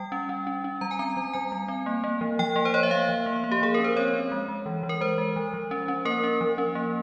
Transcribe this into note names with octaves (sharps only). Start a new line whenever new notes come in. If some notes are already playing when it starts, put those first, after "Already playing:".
Already playing: G3 G5
C#4
C#4
C#4
C#4
G3 A#5
G#5
C4 A#5
G3
G3 G#5
G3
C4
A#3
A#3
F3
F3 G5
A#3
C5
A#3 C#5
E5
A#3 F5
F3
A#3
A#3
G4
F3 G#4
C#4 A#4
C5
C4 C#5
C4
G#3
G#3
E3
E3
A#4
G#3 C5
G#3
F3
F3
C#4
C#4
A#3 A#4
C#4
F3
C#4
A#3